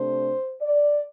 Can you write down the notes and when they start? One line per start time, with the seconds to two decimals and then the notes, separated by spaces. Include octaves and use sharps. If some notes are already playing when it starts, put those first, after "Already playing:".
Already playing: C3 A3 D4 C5
0.62 D5